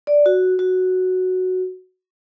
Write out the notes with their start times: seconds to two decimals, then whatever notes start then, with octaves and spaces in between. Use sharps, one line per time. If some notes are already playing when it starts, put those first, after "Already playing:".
0.07 D5
0.26 F#4
0.59 F#4